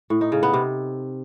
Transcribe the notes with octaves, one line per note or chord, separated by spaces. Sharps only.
A2
D#4
C#3
B3
C3